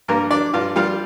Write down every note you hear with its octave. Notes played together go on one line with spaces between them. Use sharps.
G2 A#3 A#4
D4 D5
G2 F4 F5
G3 F4 F5